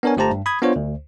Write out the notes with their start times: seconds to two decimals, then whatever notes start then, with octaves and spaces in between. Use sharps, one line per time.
0.03 B3 D4 A#4 C#5 G#5
0.17 G1 A3 G4 C5 A5 A#5
0.31 G2
0.46 B5 D#6 G#6
0.62 B3 D4 F4 C5 C#5
0.76 D2